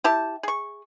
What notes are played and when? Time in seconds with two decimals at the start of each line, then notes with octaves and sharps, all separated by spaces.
0.04 E4 G4 A5
0.43 G#4 C#6